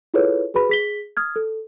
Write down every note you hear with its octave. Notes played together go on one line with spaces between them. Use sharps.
E4 F4 G#4 A4 B4 C#5
F#4 G#4 B4 B5
G#4 B6 G7
D#6 F6 G#6
A4